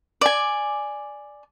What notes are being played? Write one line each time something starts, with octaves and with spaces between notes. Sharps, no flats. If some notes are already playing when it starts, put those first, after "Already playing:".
D5 G#5